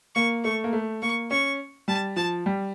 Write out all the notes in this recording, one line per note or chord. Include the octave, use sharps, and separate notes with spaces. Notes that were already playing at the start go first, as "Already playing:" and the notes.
A#3 C#6
A3 C#6
A#3
A3
A#3 C#6
C#4 C#6
G3 A5
F3 A5
G3